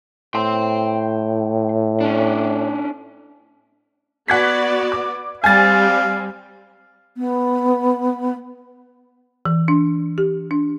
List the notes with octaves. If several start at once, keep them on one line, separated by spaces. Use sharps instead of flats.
A2 G5 C6
C#4 D4
B3 F#4 D5 F#5 G#6 B6
D6
G3 C4 F5 G#5 A6
B3
E3
D4
G4
D4